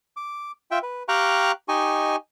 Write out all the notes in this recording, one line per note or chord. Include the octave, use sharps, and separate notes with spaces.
D6
F4 E5 G5
B4
G4 F5 G5 A#5 C#6 F#6
D#4 G4 D#5 G#5 C#6